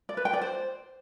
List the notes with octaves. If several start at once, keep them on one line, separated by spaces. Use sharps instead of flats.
D5
B4
G5
D5
C5